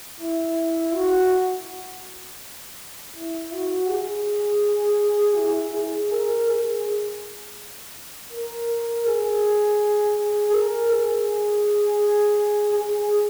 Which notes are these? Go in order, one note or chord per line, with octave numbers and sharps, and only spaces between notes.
E4
F#4
E4
F#4
G#4
E4
G#4
A#4
G#4
A#4
G#4
A#4
G#4
G#4